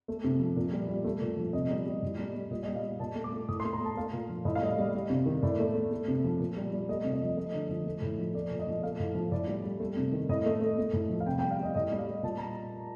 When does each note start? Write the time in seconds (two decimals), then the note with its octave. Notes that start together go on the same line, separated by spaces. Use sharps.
0.08 A3
0.24 C3
0.40 F3
0.56 A#2
0.72 G3
0.89 G3
1.04 A3
1.21 A#2
1.37 F3
1.53 C3 D#5
1.70 G3
1.86 G3
2.02 A2
2.19 G3
2.34 G3
2.51 A#2 D#5
2.63 D#5
2.67 G3
2.75 F5
2.83 G3
3.00 A#2 A5
3.15 A3
3.24 D6
3.32 A3
3.48 A2 D#6
3.60 C6
3.64 A3
3.73 A#5
3.80 A3 A5
3.97 A3 F5
4.13 A#2
4.29 F3
4.45 A2 D#5
4.55 F5
4.61 G3 D#5
4.78 G3
4.93 G3
5.10 C3
5.26 D#3
5.43 A2 D5
5.59 A3
5.75 A3
5.91 A3
6.08 C3
6.24 F3
6.40 A#2
6.56 G3
6.72 G3
6.89 A3 D#5
7.04 C3
7.13 D#5
7.22 F3
7.37 A3 D#5
7.53 D3
7.69 F3
7.85 A3
8.02 A2
8.18 F3
8.34 A3 D5
8.51 A#2
8.59 D#5
8.67 F3
8.82 A3 F5
9.00 A2
9.15 F3
9.32 A2 D5
9.47 G3
9.64 G3
9.80 A3
9.97 C3
10.12 D#3
10.29 A2 D#5
10.46 A3
10.61 A3
10.78 A3
10.93 A2
11.09 F3
11.20 F5
11.26 C3 G5
11.39 G5
11.43 G3
11.51 F5
11.59 G3 D#5
11.75 A2 D#5
11.91 G3
11.99 F5
12.07 G3
12.23 A#2 A5
12.38 A#5